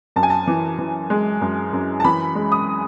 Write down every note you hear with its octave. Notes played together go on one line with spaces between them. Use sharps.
F#2 A5
G#5
A5
E3
E3
G#3
F#2
F#2
A5
E3 B5
G#3
D#6